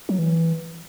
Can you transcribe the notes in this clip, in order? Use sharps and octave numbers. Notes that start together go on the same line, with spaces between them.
F#3
E3